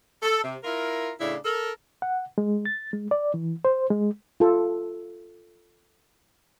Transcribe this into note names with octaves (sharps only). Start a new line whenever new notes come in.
A4
C3
E4 F4 A#4
A2 C#3 D4 E4
A4 A#4
F#5
G#3
A6
G#3
D5
E3
C5
G#3
F4 A4